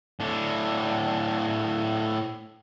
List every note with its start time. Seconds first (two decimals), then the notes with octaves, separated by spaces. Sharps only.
0.20 A2 D4